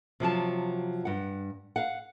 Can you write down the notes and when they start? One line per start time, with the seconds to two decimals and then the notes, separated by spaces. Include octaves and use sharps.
0.20 C3 F3 F#3 A5
1.05 G2 F#5
1.76 F5 F#5